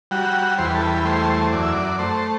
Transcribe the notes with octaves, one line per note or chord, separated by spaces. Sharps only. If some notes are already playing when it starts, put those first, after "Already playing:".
G3 F#4
E2 C5
B4
A4
B4
A3 C5
F#2 D5
E5
D5
A3 C5